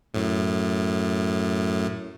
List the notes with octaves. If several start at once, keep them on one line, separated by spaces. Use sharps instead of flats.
F#2 A2